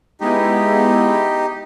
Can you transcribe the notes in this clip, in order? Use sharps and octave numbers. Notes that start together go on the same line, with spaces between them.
G#3 B3 D#4 E4 G4